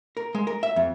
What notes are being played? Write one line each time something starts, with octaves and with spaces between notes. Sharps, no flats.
A#4
G#3
A#4
E5
F2